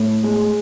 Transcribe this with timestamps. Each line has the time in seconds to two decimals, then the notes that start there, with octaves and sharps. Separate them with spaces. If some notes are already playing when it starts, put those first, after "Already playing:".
Already playing: A2
0.23 G#3